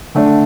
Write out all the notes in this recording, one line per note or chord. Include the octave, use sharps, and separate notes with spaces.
D3 A3 D4